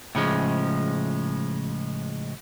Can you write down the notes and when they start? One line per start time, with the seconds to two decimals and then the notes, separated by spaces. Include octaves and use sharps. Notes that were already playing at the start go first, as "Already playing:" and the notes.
0.15 A2 C#3 F3 G#3